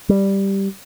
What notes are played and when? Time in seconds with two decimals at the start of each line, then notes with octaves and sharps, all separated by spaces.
0.09 G3